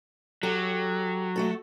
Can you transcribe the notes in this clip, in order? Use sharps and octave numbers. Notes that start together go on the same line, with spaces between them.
F#3 G4 A4
A3 F#4 A4